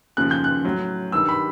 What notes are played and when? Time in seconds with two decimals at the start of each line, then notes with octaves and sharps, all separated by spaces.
0.17 D#2 C#3 F3 F#6
0.31 G6
0.44 F#6
0.65 A2 F#3
1.12 G2 D#3 G3 E6
1.29 B5